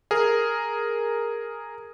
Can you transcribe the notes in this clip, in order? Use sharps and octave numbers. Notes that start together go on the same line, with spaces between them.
G#4 A#4